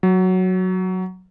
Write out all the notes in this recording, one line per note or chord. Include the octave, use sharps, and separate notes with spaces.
F#3